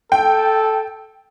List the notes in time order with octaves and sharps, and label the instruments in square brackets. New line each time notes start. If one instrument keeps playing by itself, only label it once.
[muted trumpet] A4 [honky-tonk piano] G5